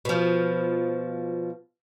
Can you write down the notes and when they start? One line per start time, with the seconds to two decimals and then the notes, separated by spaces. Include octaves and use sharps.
0.05 B2 F3